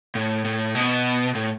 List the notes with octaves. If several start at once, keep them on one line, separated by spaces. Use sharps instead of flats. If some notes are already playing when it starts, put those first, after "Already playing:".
A2
A2
B2
A2